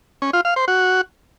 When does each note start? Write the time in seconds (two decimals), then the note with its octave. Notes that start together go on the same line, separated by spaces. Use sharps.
0.22 C#4
0.33 F4
0.45 F5
0.56 C5
0.68 F#4